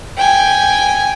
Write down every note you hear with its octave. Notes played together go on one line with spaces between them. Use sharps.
G5 G#5